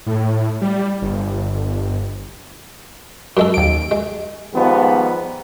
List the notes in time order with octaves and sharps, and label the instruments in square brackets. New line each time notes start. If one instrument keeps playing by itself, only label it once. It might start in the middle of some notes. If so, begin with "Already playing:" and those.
[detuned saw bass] A2
G3
G1
[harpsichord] F#2 G#3 A4
[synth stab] D#2 D7
[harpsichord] G#3
[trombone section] G#2 D#3 F3 G3 B3